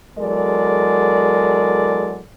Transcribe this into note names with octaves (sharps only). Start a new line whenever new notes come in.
E2 F#3 G#3 A4 A#4 D5